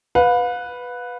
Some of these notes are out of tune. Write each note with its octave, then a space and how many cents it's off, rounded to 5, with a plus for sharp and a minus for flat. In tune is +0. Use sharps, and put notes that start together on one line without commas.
B4 +0 F5 +40